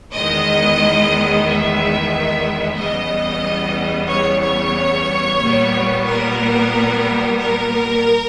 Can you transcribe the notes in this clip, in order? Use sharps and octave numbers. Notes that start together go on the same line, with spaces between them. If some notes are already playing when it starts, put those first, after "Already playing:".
E2 D#3 G#3 B3 D#5
E5
E2 C#3 G3 B3 D#5
C#5
C#5
A#2 G3 B3
A#4
A#4